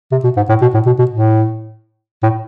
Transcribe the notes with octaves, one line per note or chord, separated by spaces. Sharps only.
C3
B2
G#2
A2
B2
A2
B2
B2
A2
A2